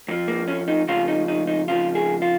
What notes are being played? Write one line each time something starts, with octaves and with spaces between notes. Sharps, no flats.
F2 F3
A#3
C#4
D#4
F2 C#3 F3 F4
D#4
D#4
D#4
F2 C#3 F3 F4
G#4
F4